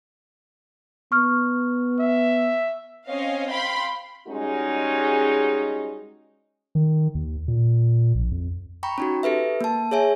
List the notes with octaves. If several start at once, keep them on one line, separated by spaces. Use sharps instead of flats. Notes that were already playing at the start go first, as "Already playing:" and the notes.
B3 C#6 F6
E5
C4 C#4 C#5 D#5 F5
F5 G5 B5 C6
G3 G#3 C#4 D#4 F#4 G#4
D#3
D#2
A#2
A#1
F2
G5 A#5 B5 C#6
C#4 D#4 F#4
G4 A4 B4 E5
A#3 A5
G#4 C#5 E5 G#5